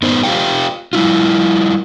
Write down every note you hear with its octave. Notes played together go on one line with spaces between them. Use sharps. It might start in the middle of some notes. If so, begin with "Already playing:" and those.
G2 B3 D#4 C5
F4 G4 G#4 C5 F5 G5
G3 E4 F4